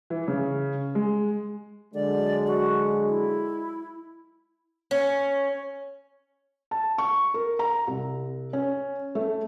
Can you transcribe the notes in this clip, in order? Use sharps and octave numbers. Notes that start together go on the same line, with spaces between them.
E3
C#3
G#3
D3 F#3 G#3 D5
F#4
E4
C#4
A5
C#6
A#4
A#5
C2
C#4
A3